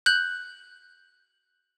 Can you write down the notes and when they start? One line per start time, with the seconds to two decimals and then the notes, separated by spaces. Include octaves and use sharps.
0.06 F#6 G6 F#7